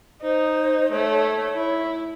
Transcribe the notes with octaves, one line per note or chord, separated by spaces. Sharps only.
D#4 C5
A3 C#5
E4